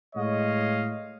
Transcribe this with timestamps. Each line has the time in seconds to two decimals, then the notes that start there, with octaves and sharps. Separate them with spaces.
0.16 A2 G#3 C#5 D#5 F5